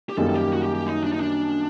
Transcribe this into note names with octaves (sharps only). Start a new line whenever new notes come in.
G4
F#2 D#3 G3 A#3 A4
A4
G4
F#4
G4
G4
D#4
D4
D#4
D4